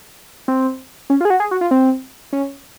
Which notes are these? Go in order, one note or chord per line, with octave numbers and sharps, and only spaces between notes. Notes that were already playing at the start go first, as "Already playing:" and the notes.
C4
C#4
F4
G#4
F#4
G#4
F#4
F4
C4
C#4